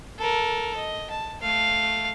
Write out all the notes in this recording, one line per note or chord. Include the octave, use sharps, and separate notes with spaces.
A4 A#4
D#5
A5
A3 F5